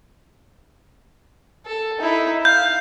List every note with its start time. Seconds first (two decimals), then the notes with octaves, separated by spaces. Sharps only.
1.66 A4
2.00 D#4 E4
2.45 F5 G6